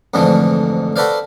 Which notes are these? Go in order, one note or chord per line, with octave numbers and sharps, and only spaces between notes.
F2 G#2 D3 E3 F3 A3
F#4 A4 B4 C5 D5 F5